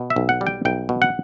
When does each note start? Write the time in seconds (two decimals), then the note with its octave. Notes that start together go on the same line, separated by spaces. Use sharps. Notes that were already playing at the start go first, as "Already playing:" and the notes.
Already playing: B2
0.10 E5
0.16 B1
0.29 F#5
0.41 G3
0.47 G5
0.65 B1 G5
0.89 B2
1.02 F#5